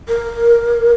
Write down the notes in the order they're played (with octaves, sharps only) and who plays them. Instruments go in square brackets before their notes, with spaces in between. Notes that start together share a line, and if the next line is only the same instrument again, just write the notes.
[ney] A#4